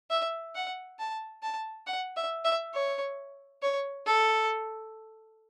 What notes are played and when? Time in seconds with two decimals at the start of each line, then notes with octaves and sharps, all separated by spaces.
0.10 E5
0.55 F#5
0.99 A5
1.43 A5
1.87 F#5
2.17 E5
2.45 E5
2.74 C#5
3.62 C#5
4.06 A4